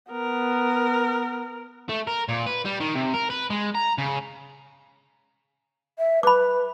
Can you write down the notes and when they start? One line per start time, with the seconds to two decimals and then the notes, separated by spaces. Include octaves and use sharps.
0.12 B3 A#4
1.89 A3
2.07 A#4
2.29 A#2
2.47 B4
2.65 G3
2.81 D#3
2.95 C3
3.14 A#4
3.30 B4
3.50 G#3
3.75 A#5
3.98 C#3
5.99 E5
6.23 B4 B5 D6